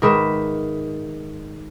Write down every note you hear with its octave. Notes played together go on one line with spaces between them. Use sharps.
G#2 D#3 B4 E5